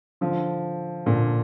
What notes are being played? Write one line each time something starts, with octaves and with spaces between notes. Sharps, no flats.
D3 F3
A#2 D3